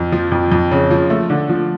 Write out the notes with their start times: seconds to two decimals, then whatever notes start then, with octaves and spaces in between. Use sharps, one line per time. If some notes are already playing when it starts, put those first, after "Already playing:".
Already playing: F2
0.12 F3
0.32 F2
0.52 F2
0.71 C#3
0.91 F3
1.10 A3
1.30 D3
1.49 F3